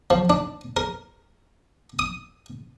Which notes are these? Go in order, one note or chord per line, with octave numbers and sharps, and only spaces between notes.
F3
D4
A#4
D#6